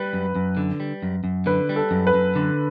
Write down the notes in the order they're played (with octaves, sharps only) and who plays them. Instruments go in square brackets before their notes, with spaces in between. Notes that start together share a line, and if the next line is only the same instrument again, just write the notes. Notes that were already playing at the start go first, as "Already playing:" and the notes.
Already playing: [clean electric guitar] G3 [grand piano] B4
[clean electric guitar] F#2
F#2
D3
G3
F#2
F#2
[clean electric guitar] D3 [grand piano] B4
[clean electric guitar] G3
[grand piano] A4
[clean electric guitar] F#2
[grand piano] B4
[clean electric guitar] F#2
D3